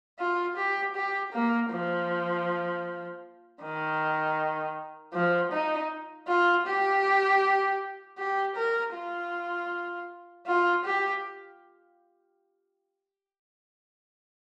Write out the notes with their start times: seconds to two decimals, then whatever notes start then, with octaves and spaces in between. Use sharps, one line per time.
0.19 F4
0.56 G4
0.95 G4
1.33 A#3
1.71 F3
3.62 D#3
5.14 F3
5.52 D#4
6.28 F4
6.66 G4
8.18 G4
8.56 A#4
8.94 F4
10.47 F4
10.85 G4